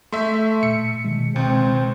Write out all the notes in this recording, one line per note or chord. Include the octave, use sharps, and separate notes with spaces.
A3 E5 C6 G6
A#2 C#7
B2 D#3 G#3
C#2 C4